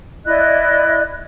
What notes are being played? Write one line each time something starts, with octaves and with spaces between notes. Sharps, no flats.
E4 D5 D#5 F#6